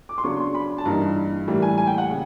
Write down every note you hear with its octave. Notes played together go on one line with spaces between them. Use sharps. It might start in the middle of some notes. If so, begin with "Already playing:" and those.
D6
C6
C#3 F#3 B3 D4 C#6
C6
B5
A5
G2 E3 G3 A#3 D#4 A#5
A2 E3 G3 A#3
G#5
G#5
G5
F#5
C#3